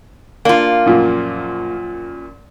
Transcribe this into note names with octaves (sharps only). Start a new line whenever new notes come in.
A#3 D4 F4
F#2 A#2 F3